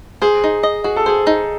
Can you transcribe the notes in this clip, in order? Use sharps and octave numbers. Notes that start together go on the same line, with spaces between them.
G#4 C5
D#4
D#5
F#4 G#4
A4
G#4 C5
D#4